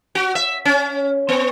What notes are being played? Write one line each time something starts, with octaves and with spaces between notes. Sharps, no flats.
F#4
E5
C#4
B3